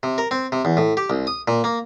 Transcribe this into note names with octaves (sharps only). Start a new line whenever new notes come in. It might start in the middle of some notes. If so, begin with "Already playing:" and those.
C3
A#4
C4
C3
E2
A2
G4
C2
D#6
A#2
A#3